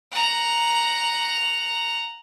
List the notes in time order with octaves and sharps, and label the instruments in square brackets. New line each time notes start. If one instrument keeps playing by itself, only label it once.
[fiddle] F#5 A#5